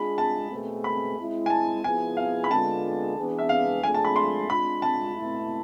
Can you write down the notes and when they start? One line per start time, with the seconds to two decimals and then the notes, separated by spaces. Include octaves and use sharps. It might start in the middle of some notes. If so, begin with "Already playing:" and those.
Already playing: G#3 D4 F4 G#4 B5
0.18 A5
0.51 B2 A3 C4 G#4
0.84 B5
1.18 G#3 C4 E4
1.46 G#5
1.50 A5
1.84 F3 B3 E4 G#4 G#5
2.17 F5
2.44 B5
2.51 D3 G#3 B3 F4 G#4 A5
3.16 E3 B3 D4 G#4
3.39 E5
3.49 F5
3.83 F3 A3 D4 G#4 G#5
3.94 A5
4.05 B5
4.16 C6
4.49 G#3 D4 F4 B5
4.82 A5
5.15 B2 A3 E4